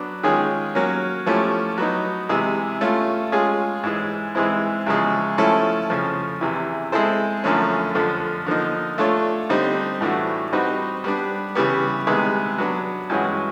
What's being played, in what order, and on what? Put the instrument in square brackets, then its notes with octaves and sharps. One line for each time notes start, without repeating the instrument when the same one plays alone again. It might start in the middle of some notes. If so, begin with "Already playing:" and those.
Already playing: [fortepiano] F#3 B3 D4
D#3 G#3 C#4 F4 G#4
F#3 A#3 C#4
F3 A3 C#4 E4 G4
F#3 B3 D#4
C3 E3 G#3
A3 C#4 F4
G#3 C#4 F4 G#4
G#2 E3 G#3
G#2 E3 G#3 C4 E4
E2 C#3 F3 G#3
F3 A3 C#4 E4 A4
F2 C#3 F3
E2 C3 E3
G#3 C4 E4 A4 C5
F#2 D3 F3 A3 C#4
F2 D3 F3
D3 F3 A#3 D#4
A3 D4 F4 A4 C#5
D3 G3 C4 D#4
A2 E3 A3 D4 F#4
G3 C4 D#4 F#4 B4
G3 B3 D4
C#3 E3 G3 B3
C3 D#3 G#3 B3
F#3 B3 D4
G2 E3 G#3 C#4 F#4